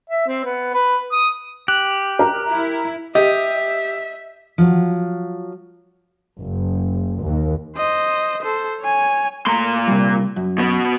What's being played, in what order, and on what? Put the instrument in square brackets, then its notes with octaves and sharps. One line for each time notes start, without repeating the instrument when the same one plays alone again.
[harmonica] E5
C4
B3
B4
D#6
[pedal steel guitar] G4 [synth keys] F#6
[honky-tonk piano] A#4
[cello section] E4
[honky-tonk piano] G4 [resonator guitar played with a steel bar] D#5 [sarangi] E5
[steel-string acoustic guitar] F3 F#3
[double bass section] F#1
D#2
[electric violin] C5 D#5
A4 C5
C#5 G#5
[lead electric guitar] A#2 C6 [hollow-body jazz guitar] A3 A#5
[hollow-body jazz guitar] C3 G3
F#2
[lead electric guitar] B2 B3